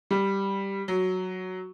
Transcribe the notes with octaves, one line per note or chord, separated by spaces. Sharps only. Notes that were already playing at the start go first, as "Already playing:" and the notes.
G3
F#3